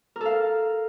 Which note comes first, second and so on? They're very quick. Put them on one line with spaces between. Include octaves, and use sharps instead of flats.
A#4 A4 F5